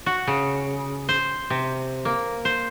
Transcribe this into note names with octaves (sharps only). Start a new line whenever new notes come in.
F#4
C#3
C5
C3
A#3
C5